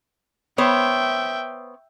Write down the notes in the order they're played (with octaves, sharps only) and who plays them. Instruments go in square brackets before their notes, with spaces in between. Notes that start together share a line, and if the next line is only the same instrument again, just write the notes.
[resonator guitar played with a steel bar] B3 C5 C#5 [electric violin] E5 G5